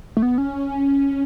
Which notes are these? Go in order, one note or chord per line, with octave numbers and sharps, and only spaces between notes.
A3
B3
C#4